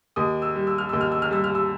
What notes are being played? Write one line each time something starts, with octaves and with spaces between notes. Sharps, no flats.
D#2 D#6
E6
G3
E6
F6
D#2 E6
F6
E6
F6
G3 E6
F6
E6